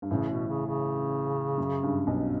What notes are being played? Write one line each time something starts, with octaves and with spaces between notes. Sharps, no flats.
G2
A1 A2 C#3
B2
C#3
C#3
F#2
G2
B1 B2